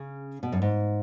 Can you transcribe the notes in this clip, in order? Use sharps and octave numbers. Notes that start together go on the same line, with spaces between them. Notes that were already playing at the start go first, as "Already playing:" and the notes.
Already playing: C#3
B2
F#2
G#2